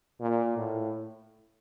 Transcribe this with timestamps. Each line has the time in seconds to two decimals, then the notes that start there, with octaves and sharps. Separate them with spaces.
0.21 A#2
0.57 A2